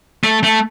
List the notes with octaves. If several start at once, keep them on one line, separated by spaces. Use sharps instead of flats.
A3
A3